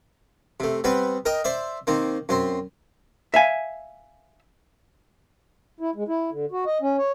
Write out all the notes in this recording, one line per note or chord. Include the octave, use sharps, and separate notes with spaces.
C3 A3
G3 B3 C4 B4
A#4 D#5 G5
C5 D5 E5
D#3 A#3 C4
F#2 C4 C6
E5 F5 G#5
E4
G#3
E4
D3
F#4
D#5
C#4
C#5